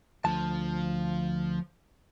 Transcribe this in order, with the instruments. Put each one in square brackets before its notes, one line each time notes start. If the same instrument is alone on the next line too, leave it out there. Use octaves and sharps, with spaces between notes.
[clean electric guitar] D2 A5 [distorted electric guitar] F3